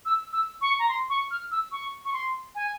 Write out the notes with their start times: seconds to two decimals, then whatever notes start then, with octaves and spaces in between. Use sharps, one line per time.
0.05 E6
0.32 E6
0.61 C#6
0.79 A#5
0.89 C6
1.10 C#6
1.31 F6
1.51 E6
1.72 C#6
2.05 C#6
2.13 C6
2.55 G#5